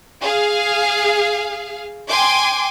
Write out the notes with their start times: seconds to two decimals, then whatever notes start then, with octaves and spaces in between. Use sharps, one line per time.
0.23 G#4 F5
2.09 G5 G#5 C6 D6